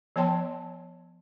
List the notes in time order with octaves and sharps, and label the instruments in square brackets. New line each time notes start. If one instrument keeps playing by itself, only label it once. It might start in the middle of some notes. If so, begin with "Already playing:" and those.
[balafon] F3 B3 C#5 G5 A5 C6